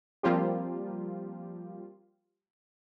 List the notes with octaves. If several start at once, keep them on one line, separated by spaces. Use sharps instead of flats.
F3 G3 A#3 C4 F4 G4